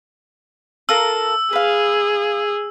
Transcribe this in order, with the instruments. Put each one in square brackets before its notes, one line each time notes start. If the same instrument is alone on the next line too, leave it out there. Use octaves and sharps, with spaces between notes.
[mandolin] F4 A4 A#4 [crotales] E6
[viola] G#4 [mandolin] B4 F5